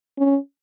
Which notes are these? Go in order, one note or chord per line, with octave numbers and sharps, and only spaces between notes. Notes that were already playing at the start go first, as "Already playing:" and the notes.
C#4